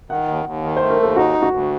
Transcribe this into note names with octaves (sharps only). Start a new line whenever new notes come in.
D#3 F#5
D#2
D#2
D#3
C5
A3
A#4
D#2 A4
D#4 F#4
D2
F#4
D2